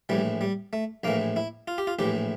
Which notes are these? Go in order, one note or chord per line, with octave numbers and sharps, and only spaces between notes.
A#1 A2 E3 G3
G3
A3
A#1 A2 E3 A#3
E4
F4
G4
F4
A#1 A2 E3 G4